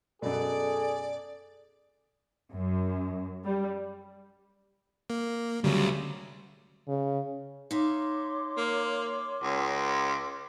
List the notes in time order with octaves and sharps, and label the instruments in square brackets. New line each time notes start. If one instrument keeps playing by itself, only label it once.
[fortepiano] F#2 B2 [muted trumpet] G#4 [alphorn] A4 [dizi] D5
[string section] F#2
G3
[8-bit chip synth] A#3
[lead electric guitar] D2 [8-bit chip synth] C#3 F#3 G3
[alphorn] C#3
[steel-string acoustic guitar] D#4 E5 F5 [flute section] C#5 C6 D6
[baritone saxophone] A#3
C#2